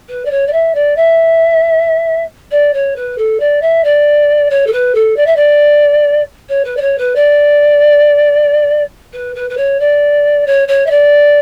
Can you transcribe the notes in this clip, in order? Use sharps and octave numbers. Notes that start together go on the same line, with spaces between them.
B4
D5
C#5
D5
E5
D5
E5
D5
C#5
B4
A4
D5
E5
D5
C#5
A4
B4
A4
D5
E5
D5
C#5
B4
D5
C#5
B4
D5
B4
B4
B4
C#5
D5
C#5
C#5
E5
D5